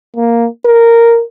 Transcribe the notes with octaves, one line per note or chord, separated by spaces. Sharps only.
A#3
A#4